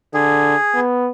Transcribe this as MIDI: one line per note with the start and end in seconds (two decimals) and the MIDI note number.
0.14 0.55 50
0.14 0.80 68
0.75 1.10 59